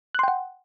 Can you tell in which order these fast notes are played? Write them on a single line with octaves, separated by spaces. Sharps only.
F#6 C6 G5 F#5